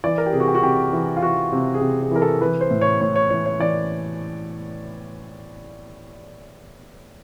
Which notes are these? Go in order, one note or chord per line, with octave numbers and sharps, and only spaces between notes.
E3 D5
A#4
G4
C3 G#4
F#4
G4
F#4
C3 G4
E3
F4
E3 F#4
C3
G#4
C3 G4
G#4
E3 A#4
A4
E3 B4
C5
A2
C#5
A2 C#5
C#5
E3 C#5
C#5
E3 D5